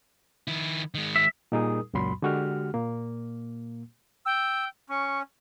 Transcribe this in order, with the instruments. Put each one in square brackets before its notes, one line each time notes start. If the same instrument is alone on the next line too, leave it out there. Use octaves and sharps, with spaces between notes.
[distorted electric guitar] D#3 E4
D#3 G#3
[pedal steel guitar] E5
[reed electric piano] A#2 G3 D#4 G#4 A#4 D#6
C#2 F#2 A#2 F#3 B5 C6
D3 G#3 F#4 G4 F6
A#2 A#3
[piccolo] G5 [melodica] E6
[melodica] C#4 [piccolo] C#6